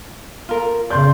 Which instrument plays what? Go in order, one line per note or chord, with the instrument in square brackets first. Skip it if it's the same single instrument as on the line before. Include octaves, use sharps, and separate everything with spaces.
[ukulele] F4 A#4
[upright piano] C#3 C6 G6 [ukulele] D5